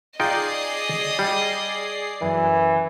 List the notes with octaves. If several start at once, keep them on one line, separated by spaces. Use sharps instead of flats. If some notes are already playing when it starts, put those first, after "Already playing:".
D#4 F4 G#4 D5 D#5 G5 C7
G3
F#2 E3